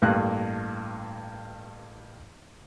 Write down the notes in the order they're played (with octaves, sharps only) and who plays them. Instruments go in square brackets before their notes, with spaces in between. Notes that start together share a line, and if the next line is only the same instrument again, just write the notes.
[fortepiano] A1 G2 A#3 F#6